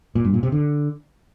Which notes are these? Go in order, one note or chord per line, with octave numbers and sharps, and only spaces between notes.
A#2
G2
A#2
C3
D3